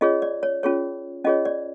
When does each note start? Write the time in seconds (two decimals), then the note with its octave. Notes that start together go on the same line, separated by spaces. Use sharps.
0.01 C#4 F4 G#4 C#5 D#5
0.22 D5
0.43 C#5
0.63 C#4 F4 G#4 C#5
1.25 C#4 F4 G#4 C#5 D#5
1.45 D5